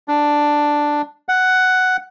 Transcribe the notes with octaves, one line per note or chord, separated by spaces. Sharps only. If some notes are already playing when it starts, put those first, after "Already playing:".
D4
F#5